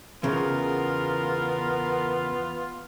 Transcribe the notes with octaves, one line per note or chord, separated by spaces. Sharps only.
E2 C#3 B3 F4 A#4